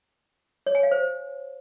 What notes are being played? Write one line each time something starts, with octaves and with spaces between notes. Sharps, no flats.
C#5
G#5
F5
C5